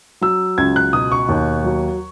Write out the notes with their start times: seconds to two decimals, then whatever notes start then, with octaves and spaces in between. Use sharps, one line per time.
0.21 F#3 E6
0.58 C#2 G#6
0.76 F#6
0.93 B2 D#6
1.12 C#6
1.29 D#2
1.64 F#3